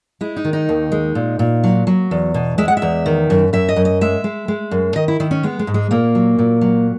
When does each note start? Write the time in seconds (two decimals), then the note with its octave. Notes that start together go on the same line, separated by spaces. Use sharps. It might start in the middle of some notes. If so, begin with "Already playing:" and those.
0.21 G#3 E4
0.36 D#4
0.45 D#3
0.53 D#4
0.69 D#2
0.92 G#3
1.15 A#2
1.39 A#2
1.64 F#3
1.87 F#3
2.11 E2
2.34 B2
2.58 G#3 E5
2.68 F#5
2.77 E5
2.82 E2
3.06 D#3
3.30 F#2
3.53 F#2 E5
3.69 D#5
3.76 F#2
3.85 D#5
4.01 G#3 E5
4.24 G#3
4.48 G#3
4.71 F#2
4.96 D#3 D#5
5.08 E4
5.20 D#3 E4
5.31 C#4
5.43 G#3 B3
5.59 G#3
5.67 G#2
5.74 G#3
5.91 A#2 A#3
6.15 F#3
6.39 A#2
6.61 F#3